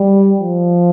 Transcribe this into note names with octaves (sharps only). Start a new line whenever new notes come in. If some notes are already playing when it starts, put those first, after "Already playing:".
Already playing: G3
F3